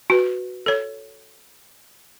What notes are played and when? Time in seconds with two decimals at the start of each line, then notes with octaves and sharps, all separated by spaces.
0.10 F#4 B4
0.66 A4 C#5